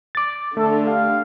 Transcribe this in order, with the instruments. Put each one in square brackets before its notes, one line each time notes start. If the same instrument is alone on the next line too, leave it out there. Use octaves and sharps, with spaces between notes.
[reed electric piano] D6 A6
[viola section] D3 [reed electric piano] A3 [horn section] A4
[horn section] G4 F5